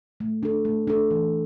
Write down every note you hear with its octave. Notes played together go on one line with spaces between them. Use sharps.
A3
D4 A4
A3
D4 A4
E3